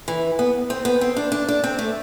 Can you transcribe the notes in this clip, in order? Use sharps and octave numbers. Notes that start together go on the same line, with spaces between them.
E3
B3
C4
B3
C4
D4
D4
D4
C4
A3